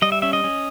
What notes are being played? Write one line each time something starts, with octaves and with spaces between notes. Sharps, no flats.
G3 D#5
E5
C#4 E5
D#5
C#4